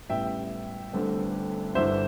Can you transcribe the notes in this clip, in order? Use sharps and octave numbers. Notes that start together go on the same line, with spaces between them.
A1 A2 G3 B3 E5 G5
G1 G2 D3 A3 C4
G1 G2 E3 C5 E5